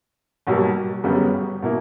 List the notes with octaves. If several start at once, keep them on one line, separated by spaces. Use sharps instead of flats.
B1 B2 G3 A#3
G1 F#2 C#3 G3 B3
B2 A#3 E4